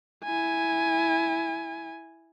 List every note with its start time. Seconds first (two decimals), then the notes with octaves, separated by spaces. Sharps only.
0.24 E4 G#5